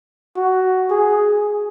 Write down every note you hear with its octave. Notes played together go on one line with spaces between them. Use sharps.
F#4
G#4